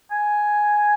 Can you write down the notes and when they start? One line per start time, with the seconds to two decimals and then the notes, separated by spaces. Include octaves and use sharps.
0.12 G#5